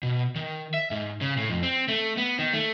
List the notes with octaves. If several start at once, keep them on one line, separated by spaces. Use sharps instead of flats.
B2
D#3
E5
G#2
C#3
A2
F2
C4
A3
B3
D#3
A3